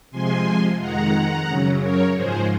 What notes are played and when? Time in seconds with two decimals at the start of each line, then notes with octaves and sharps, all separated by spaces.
0.11 C3 F3 G#3 G#5 C6
0.79 F2 D#3 G#3 F#5 A#5
1.47 F#2 C#3 F#3
1.81 A#4 C#5
2.14 G#2 F3 G#3 G#4 C5